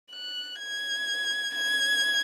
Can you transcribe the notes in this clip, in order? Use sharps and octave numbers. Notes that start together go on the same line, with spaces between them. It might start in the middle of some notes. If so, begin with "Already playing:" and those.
F#6
G#6
G#6